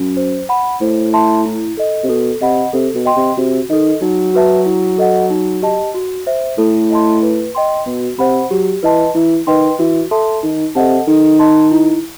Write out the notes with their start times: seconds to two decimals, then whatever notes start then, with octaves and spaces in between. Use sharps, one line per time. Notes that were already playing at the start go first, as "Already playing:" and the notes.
Already playing: F#2
0.17 C5
0.49 F#5 B5
0.81 A2 C5
1.13 E5 A5 C6
1.45 E4
1.77 A4 D#5
2.04 C3
2.09 B2 A4
2.41 C3 D#5 F#5 B5
2.73 C3 A4
2.95 B2
3.05 D#5 G5 C6
3.16 C3
3.37 C3 F#4
3.70 D#3 A4 D#5
4.01 F#3 D#4
4.34 F#4 B4 E5 A5
4.66 E4
4.98 A4 D#5 F#5
5.30 D#4
5.62 G4 D#5 A5
5.94 F#4
6.27 C5 E5
6.58 A2 A4
6.91 D#5 A5 C6
7.23 B4
7.55 D#5 G5 C6
7.86 B2 F#4
8.19 C3 C5 F#5 B5
8.51 F#3 G4
8.83 E3 B4 D#5 A5 C6
9.15 E3 E4
9.47 D#3 B4 D#5 G5 C6
9.79 E3 F#4
10.11 A4 E5 A5 C6
10.43 D#3 D#4
10.75 C3 A4 D#5 F#5 A5
11.07 D#3 A4
11.39 D#5 A5 C6
11.71 E4